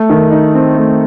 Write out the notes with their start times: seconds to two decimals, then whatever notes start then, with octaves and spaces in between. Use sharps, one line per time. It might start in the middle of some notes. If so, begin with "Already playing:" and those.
Already playing: A3
0.09 D#3
0.31 D#4
0.54 C4
0.76 A3